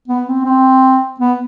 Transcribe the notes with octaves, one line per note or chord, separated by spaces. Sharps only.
B3
C4
C4
B3